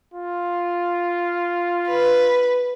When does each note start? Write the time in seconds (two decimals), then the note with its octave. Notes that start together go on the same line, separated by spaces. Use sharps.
0.14 F4
1.89 B4